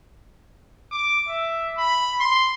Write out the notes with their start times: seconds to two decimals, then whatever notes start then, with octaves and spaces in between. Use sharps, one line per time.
0.91 D6
1.28 E5
1.77 B5
2.20 C6